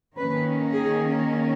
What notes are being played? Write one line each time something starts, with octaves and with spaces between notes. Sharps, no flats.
D#3 A#3 C#4 B4
G#4